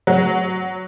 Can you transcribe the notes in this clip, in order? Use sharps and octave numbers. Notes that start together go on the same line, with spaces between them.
F#3